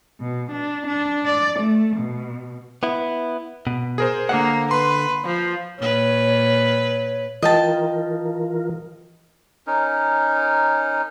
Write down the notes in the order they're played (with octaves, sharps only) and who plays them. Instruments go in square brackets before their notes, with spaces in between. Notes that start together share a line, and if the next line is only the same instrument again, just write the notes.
[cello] B2
D4
D4
D5
A3
B2
[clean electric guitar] B3 E4
B2
[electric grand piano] G#4 A#4 C5
[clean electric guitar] D3 F#5 [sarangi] A#3
[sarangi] B4 [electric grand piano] C6
[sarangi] F3
[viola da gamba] A#2 B4 [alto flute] C#5
[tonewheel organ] E3 F4 A#4 [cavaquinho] D#5 G5 A5
[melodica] C#4 D#4 A#4